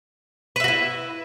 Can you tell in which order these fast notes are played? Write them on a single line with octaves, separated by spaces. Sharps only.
B4 E5 F#4 E4